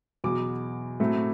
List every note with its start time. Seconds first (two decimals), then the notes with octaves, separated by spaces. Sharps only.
0.24 E2 B2 F#3 D6
1.00 A2 F#3 A3 C4